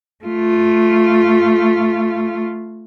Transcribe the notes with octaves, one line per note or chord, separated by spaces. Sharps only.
A3 F4